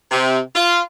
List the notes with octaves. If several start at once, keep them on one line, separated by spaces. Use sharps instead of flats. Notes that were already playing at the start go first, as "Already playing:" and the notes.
C3
F4